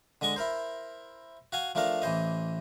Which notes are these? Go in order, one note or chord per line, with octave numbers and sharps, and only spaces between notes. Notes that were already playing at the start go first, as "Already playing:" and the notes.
D3 G#3 D#5 C#6
E4 A#4 C5
F#4 F5 G#5
F3 A3 D4 A#4 F5
A1 E3 C5 D#5